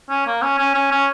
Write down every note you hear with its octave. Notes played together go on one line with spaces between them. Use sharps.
C#4
A#3
C#4
C#4
C#4
C#4